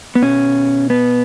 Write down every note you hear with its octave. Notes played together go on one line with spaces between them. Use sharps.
B3
B2 C#4
B3